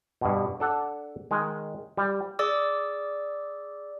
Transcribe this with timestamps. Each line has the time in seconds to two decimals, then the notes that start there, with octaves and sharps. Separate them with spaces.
0.21 G2 B2
0.60 D4 A4 F#5
1.31 D#3 G#3
1.97 G3
2.39 G#4 D5 D6 E6